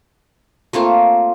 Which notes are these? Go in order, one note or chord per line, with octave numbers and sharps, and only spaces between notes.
A3 A#3 C4 F4